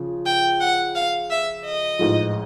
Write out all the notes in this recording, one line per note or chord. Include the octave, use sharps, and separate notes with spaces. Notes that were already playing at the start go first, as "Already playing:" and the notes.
Already playing: C#3 F3
G5
F#5
F5
E5
D#5
A1 G#2 F3